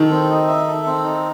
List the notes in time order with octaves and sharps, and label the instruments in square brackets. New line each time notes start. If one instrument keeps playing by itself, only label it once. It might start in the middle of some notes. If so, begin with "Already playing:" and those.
Already playing: [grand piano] D#3 [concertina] A4
[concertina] C4
D#4
E5
A4
C4
D#4